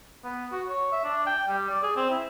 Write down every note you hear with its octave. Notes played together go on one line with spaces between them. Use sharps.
B3
F#4
C#5
E5
D4
G5
G3
D5
G#4
C4
E4